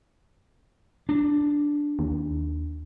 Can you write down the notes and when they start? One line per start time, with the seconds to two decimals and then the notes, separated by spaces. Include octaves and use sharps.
1.09 D4
1.99 D#2